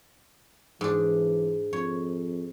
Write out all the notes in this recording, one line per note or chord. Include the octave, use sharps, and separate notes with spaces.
G#2 E3 D4
F2 C#5